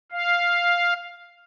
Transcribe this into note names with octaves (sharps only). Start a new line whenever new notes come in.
F5